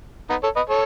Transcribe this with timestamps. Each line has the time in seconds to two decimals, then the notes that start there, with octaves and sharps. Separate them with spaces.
0.30 B3 D#4
0.43 A4 C#5
0.56 B4 D#5
0.70 A4 C#5